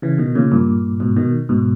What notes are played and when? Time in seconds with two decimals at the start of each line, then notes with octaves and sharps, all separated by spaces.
0.02 C#3 E3
0.18 B2 D#3
0.35 A#2 C#3
0.52 G2 A#2
1.00 G#2 B2
1.16 B2 D#3
1.49 G#2 B2